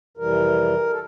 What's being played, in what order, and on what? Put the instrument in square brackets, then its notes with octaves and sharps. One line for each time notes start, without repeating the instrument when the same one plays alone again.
[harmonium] F2 C3 E3 G3 A#4
A4